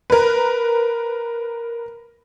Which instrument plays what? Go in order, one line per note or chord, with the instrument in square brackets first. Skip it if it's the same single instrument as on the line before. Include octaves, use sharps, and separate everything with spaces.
[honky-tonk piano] A#4 B4